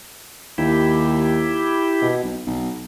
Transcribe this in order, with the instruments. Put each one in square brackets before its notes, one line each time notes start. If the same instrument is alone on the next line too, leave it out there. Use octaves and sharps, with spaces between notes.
[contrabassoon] D#2 [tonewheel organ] E4 G4
[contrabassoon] B2
B1
B1